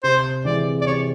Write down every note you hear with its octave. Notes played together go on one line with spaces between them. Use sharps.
C3 C5
E3 G#3 C4 D5
D5
C3 C#5